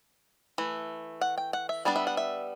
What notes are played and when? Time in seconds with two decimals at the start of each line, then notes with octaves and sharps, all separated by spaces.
0.58 E3 A3
1.21 F#5
1.38 G5
1.53 F#5
1.69 E5
1.85 G3 B3 D4 D5
1.96 E5
2.07 F#5
2.17 E5